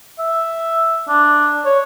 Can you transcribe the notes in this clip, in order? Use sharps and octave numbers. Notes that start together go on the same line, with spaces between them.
E5
D4
C#5